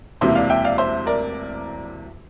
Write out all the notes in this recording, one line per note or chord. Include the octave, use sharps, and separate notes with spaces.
E1 D2 C3 E3 A#3 C5 E5
D5 F5
E5 G5
D5 F5
C5 E5
A#4 D5